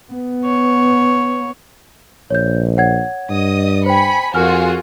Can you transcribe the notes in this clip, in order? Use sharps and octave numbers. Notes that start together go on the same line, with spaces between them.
B3
C#5
A#1 C#5 G6
C#5 F#5 G#6
G2 D#5 D#6
C5 G5 G#5 B5 C#7
F2 F4 F#4 G#4 A#4 G#5 F6